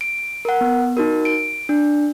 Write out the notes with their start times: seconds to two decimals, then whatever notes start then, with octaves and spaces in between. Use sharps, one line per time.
0.01 D7
0.45 A#4 F#5
0.61 B3
0.97 D#4 F#4 A#4
1.25 D7
1.69 D4